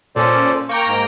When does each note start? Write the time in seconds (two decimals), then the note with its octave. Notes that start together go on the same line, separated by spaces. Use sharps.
0.16 A#2 C#4 A4 C5 D5
0.69 A#3 G5 A#5 C#6
0.87 G#2